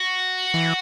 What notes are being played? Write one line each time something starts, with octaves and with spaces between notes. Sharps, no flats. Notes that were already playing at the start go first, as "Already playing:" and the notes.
Already playing: F#4
E3